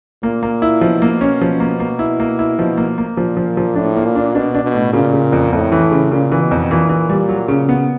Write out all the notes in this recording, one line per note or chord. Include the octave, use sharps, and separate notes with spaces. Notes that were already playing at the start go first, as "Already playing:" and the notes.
A#2 A#3
A#3
E4
B2 F3
A#3
B2
C#4
F3
A#3
A#3
E4
A#3
E4
B2 F3
A#3
A#3
A#2 F3
F3
F3
A2 D4
A#3
A#2
D4
B2 D4
D4
B2
A2
A#2 C#3
C#3
F2
F2 A2
E3
C#3
A#2 C#3
E3
B2
F2
A#2 E3
E3
G3
F#3
C#3
B3